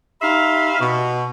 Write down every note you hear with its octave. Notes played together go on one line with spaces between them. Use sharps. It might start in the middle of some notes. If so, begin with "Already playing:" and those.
D#4 G4 E5 F5 B5 C6
B2